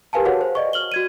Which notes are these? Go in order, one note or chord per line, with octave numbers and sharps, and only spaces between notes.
G4 A#4 B4 F5 G#5 A5
F#4 G#4 B4 C#5 F5 F#5
C5
D5 D#5 C#6
F6 F#7 G7
F#4 G#6 D#7